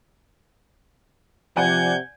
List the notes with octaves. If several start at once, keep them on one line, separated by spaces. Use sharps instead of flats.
C3 F3 D5 F#5 G#5 G6 G#6